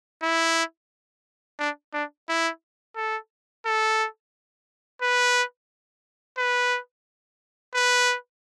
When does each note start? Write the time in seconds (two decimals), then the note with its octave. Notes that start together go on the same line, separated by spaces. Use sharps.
0.23 E4
1.59 D4
1.93 D4
2.29 E4
2.96 A4
3.65 A4
5.02 B4
6.38 B4
7.75 B4